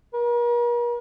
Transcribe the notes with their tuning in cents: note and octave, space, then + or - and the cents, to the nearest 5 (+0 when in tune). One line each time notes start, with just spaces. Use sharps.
A#4 +45